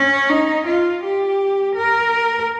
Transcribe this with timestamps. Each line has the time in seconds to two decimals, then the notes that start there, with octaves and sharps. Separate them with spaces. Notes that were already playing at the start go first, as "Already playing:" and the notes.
Already playing: C#4
0.30 D#4
0.66 F4
1.04 G4
1.76 A#4